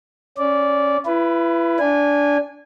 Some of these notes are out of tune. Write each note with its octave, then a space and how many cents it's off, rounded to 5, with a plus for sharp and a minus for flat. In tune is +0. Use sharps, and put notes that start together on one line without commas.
C#4 +0 D5 -15
E4 +35 B4 +0
D4 -20 G#5 -20